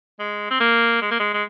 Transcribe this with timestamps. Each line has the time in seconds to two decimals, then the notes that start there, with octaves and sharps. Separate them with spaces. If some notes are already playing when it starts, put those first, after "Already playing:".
0.19 G#3
0.51 C4
0.60 A#3
1.02 G#3
1.11 A#3
1.20 G#3
1.34 G#3